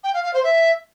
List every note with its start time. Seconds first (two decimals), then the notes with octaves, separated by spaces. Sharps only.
0.04 G5
0.14 F5
0.24 F5
0.34 C5
0.44 E5